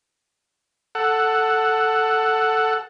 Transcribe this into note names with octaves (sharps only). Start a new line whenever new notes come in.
A4 F#5